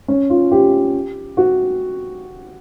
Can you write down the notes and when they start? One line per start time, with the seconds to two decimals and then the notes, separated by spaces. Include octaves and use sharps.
0.08 C#4
0.30 F4
0.51 G4
1.37 F#4